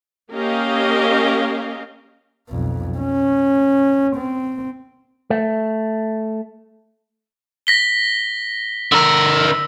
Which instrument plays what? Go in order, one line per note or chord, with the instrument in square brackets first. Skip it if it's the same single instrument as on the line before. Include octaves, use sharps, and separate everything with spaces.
[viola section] A#3 C#4 G4 A#4 D#5 F5
[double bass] B1 F2
C#4
C4
[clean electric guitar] A3
[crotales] A#6 B6 G7
[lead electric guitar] D3 A#4 [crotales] E6